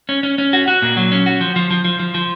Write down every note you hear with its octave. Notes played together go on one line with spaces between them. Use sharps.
C#4
C#4
C#4
F#4
F#4
A#2
F#3
C#4
F#4
F3
F3
F3
F3
F3
F3